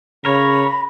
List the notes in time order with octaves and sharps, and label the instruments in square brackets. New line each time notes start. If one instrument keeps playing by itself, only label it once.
[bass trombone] C#3 [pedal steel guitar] A#4 C#5 [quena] B5